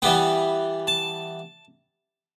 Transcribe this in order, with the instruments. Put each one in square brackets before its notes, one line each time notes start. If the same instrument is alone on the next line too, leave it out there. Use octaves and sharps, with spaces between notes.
[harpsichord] E3 G3 B3 G5
A5